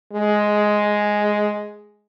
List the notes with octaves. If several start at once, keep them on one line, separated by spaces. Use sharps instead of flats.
G#3